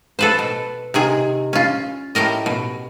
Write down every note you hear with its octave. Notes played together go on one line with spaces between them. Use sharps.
A4 B4 C5
B2
C3 D#3 G#4
C#4 F4
A2 G4 A#4 D#5
B2